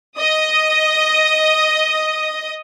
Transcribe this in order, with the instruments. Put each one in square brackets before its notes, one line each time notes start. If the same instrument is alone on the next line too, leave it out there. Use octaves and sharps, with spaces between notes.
[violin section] D#5 D#6